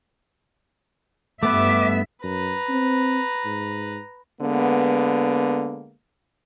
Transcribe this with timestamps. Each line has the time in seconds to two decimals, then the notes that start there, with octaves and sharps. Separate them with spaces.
1.43 G2 A3 B3 B4 E5 D6
2.24 F#2 B4 A#5
2.69 C4
3.45 G#2
4.41 D3 G#3 A#3 B3